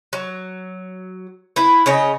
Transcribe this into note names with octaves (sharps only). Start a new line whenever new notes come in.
F#3
E4 B4
C#3 C#5 D#5